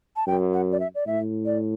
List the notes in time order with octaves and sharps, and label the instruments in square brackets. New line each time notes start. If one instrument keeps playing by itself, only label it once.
[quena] A5
[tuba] F#2 [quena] G5
[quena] F#5
D5
E5
D5
[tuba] A2 [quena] E5
[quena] D5